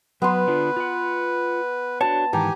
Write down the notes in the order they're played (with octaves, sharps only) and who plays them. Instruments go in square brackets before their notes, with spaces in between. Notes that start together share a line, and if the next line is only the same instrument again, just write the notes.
[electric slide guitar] F#3 [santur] B3 C6 [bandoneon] B4
[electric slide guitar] D3 D4 F4
F4 F#5
[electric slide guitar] D4 F#4 C#5 [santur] A5
[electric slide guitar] G#2 D#3 E3 [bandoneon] G4 G#5 [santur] A#5